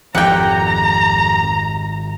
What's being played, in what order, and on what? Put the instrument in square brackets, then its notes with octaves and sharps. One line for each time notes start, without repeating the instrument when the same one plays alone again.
[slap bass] G#1 A#2 [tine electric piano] F2 G4 [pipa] F#5 G5 [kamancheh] A#5